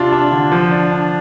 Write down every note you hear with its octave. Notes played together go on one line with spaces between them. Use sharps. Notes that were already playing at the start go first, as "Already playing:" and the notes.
Already playing: C3 D4 F4
D4
D3
F3
D4
D4